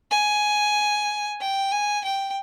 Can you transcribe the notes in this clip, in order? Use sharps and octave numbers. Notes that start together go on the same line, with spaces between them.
G#5
G5
G#5
G5